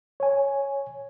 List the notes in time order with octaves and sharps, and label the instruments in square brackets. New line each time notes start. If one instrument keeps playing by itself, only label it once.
[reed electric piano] C#5 G#5